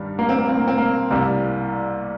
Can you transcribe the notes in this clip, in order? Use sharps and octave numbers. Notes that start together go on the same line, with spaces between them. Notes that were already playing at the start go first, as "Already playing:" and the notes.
Already playing: G2 D#3 G3
A#3
C4
A#3
C4
A#3
C4
A#3
C2 C3 G3 A#3